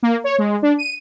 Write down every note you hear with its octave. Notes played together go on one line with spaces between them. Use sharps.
A#3
C#5
G#3
D4
D#7